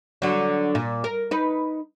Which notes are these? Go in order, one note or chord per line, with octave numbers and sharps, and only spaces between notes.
D3 F#3
A#2
A#4
D#4 B4